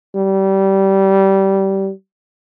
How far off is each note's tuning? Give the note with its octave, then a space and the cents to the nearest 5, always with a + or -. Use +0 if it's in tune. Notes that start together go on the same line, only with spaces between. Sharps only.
G3 -20